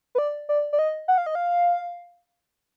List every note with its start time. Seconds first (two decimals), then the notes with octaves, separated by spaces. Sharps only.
0.15 B4
0.18 D5
0.49 D5
0.73 D5
0.79 D#5
1.08 F#5
1.18 F5
1.26 D#5
1.35 F5